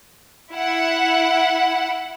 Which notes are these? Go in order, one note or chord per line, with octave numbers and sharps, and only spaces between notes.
E4 F#5